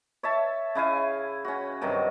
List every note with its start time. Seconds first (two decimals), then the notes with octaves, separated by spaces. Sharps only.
0.23 C#5 E5 A5
0.75 C#3 E4 F5 G#5
1.45 C#4 F#4
1.81 G2 C3 D#3 F#3